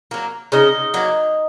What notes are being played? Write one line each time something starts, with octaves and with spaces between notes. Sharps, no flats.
F#3 A#3
C#3 D#4 D#5
F#3 A#3